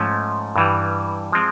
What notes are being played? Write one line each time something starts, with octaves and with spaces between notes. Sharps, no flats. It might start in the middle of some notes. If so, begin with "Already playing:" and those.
Already playing: G#2 F3 A3 C#4
G2 E3 G3
F3 G#3 C4